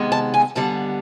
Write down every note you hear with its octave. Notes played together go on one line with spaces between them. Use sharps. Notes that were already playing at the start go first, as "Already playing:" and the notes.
Already playing: C3 D#3 G#3 B3
A5
G#5
D#2 D3 G3 B3 A5